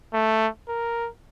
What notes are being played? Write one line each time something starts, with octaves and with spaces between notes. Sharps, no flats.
A3
A#4